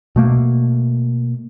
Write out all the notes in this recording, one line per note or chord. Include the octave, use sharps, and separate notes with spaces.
B2 A3 A#3